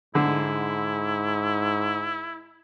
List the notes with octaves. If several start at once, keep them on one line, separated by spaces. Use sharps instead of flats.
G#2 D3 E4